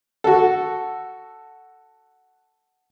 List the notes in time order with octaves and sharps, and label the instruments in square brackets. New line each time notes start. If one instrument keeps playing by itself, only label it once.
[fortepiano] F#4 A4